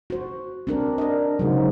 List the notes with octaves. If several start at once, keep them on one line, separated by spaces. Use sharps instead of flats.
F#4 C5
C4 D4 A#4
D4 A#4 D#5
G#2 C#3 F#3